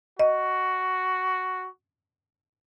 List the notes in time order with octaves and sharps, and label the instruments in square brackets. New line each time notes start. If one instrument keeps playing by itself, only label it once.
[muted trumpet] F#4 [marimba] D#5